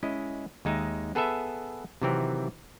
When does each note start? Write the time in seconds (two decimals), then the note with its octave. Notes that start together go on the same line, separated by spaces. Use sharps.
0.03 G#3 C#4 E4 D#5
0.65 D#2 G#3 D#4 E5
1.15 B3 G#4 A4 B4 E5
2.02 C3 D#3 E3 F#3 C4 A#4